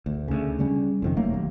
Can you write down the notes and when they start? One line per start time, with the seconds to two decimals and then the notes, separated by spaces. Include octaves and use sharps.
0.06 D2
0.28 D2 C#3
0.59 C#3 G3 C#4
1.02 F2 C3 D#3
1.17 E1 F#3 A3 A#3
1.34 D1 D#2